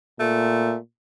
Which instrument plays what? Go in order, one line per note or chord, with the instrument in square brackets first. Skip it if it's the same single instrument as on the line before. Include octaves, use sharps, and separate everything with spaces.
[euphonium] A#2 [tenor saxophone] A3